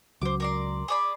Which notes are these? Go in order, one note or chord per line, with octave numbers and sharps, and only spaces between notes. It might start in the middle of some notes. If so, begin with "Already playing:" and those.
C#2 F#3 C5 D6
A#4 D5 C6
G#4 D5 B5